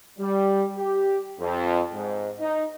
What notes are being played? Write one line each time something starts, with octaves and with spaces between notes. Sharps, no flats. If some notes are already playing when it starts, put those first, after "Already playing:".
G3
G4
F2
G#2
D#4